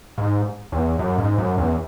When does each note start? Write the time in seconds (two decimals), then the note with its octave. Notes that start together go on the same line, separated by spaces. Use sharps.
0.18 G#2
0.72 E2
0.99 F#2
1.18 G#2
1.38 F#2
1.58 E2